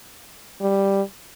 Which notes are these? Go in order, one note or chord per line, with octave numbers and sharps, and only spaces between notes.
G3